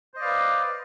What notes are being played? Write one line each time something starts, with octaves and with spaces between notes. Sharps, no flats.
B4 C5 D5 D#5 F5